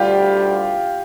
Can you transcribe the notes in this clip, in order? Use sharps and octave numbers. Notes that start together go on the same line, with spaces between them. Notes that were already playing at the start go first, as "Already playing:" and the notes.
Already playing: D2 D3 G3 F4 G4